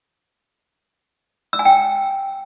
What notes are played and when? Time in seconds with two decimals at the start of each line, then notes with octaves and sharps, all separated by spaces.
1.53 E6
1.59 G#5
1.65 G5